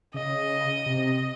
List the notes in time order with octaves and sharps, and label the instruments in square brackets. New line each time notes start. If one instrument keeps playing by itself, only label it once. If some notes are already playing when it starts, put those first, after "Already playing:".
[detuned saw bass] C#3 [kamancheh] D#5
[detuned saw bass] C3